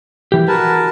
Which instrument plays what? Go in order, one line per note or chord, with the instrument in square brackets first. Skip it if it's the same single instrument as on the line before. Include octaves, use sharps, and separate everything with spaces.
[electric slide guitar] E3 G4
[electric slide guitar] F#4 G#4 [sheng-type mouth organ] A#4 B4 A5